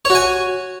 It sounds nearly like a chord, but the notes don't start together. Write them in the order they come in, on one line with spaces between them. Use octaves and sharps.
C#5 F#4 G#5